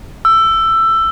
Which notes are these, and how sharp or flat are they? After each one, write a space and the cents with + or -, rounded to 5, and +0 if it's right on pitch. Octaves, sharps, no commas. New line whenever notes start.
E6 +15